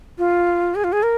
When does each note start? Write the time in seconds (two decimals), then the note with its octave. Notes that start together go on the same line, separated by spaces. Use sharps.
0.18 F4
0.75 G#4
0.84 F4
0.93 G#4
1.03 A#4